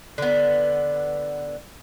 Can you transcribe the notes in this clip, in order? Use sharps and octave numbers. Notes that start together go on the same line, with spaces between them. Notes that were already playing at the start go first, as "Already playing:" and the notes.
D3 B3